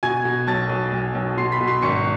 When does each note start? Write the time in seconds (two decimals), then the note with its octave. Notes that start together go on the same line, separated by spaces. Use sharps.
0.03 B2 G#5 G#6
0.25 B2
0.47 B1 A5 A6
0.70 B1
0.93 B1
1.15 B1
1.37 B2 C6 C7
1.52 B5 B6
1.61 B2
1.67 C6 C7
1.82 G#1 C#6 C#7